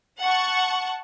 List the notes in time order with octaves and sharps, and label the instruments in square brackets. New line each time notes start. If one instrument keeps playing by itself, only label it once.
[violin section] F#5 A5 C#6